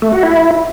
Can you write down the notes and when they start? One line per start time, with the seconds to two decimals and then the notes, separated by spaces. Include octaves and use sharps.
0.02 A3
0.13 F#4
0.23 E4